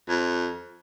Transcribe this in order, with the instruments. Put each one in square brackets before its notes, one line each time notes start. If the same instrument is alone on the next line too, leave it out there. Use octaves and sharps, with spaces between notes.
[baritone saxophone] F2